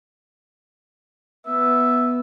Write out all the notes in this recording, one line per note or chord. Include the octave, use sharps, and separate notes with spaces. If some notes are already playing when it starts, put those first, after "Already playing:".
B3 E5